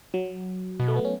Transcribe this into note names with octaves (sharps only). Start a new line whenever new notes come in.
F#3
B2
A3
B3
C#4